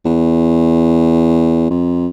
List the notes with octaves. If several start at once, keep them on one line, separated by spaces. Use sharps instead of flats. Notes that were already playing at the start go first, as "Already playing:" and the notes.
E2
F2